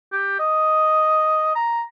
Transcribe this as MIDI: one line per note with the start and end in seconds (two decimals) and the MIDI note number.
0.12 0.36 67
0.39 1.52 75
1.55 1.82 82